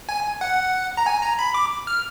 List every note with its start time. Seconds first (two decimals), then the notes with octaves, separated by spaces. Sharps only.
0.09 G#5
0.41 F#5
0.97 A#5
1.06 G#5
1.22 A#5
1.39 B5
1.54 D6
1.87 F6